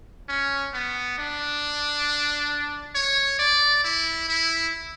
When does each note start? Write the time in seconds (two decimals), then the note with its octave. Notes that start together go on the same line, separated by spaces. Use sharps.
0.29 C#4
0.74 B3
1.18 D4
2.95 C#5
3.39 D5
3.84 E4
4.29 E4